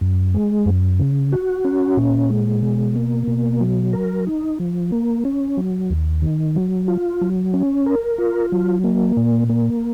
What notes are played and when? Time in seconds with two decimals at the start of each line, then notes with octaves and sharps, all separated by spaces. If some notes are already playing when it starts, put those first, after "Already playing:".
0.01 F#2
0.34 G#3
0.66 F#2
0.99 C#3
1.32 F#4
1.64 C#4
1.97 A#2
2.30 G#3
2.63 B2
2.96 A#3
3.27 B2
3.61 F#3
3.93 A#4
4.27 D#4
4.60 F3
4.92 A#3
5.25 C#4
5.57 F#3
5.90 D#2
6.22 D#3
6.56 F#3
6.88 F4
7.21 F#3
7.54 C#4
7.86 A#4
8.18 F4
8.52 F#3
8.84 A#3
9.17 A#2
9.49 A#3